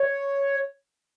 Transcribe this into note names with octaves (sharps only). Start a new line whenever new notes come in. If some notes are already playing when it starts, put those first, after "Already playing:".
Already playing: C#5